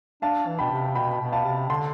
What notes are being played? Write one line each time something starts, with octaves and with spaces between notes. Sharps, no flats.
D4 F5 A5
E3
B2 G5 B5
C3
B2 G5 B5
B2
F5 A5
C3
D3 A5 C6